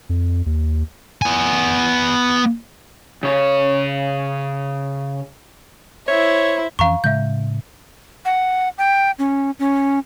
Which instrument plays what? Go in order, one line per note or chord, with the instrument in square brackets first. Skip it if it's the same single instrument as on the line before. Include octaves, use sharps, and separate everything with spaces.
[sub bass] F2
D#2
[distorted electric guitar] B3 G#5
[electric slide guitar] C#3 C#5
[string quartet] E4 C5 E5 [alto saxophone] C#5
[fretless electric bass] F2 E3 C#4 [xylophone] F5 A#5 C#6
[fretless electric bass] A2 C#3 G#3 [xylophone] E5 G6
[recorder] F#5
G5
C#4
C#4